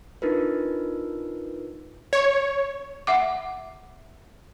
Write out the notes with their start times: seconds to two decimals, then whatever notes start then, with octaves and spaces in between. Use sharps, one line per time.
0.22 D4 D#4 F4 A#4 B4
2.13 C#5
3.07 E5 F#5 D6